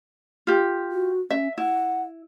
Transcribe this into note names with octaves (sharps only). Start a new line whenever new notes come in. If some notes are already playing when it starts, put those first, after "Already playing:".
F4 G4
F#4
C#4 E5
E4 F#5